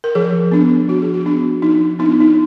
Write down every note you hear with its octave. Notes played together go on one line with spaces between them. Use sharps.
A#4
F3 G#4
B3 D4
F3 F#4
G#4
F#4
B3 D4
F3 D#4
B3 D4 D#4
F4
D#4